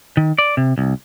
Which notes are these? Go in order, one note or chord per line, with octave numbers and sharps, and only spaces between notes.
D#3
D5
C3
C2